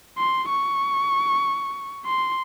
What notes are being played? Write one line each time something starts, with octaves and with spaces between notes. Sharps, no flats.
C6
C#6
C6